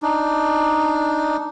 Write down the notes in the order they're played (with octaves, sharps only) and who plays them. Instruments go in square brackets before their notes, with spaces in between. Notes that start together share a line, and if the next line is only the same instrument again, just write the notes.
[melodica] D4 D#4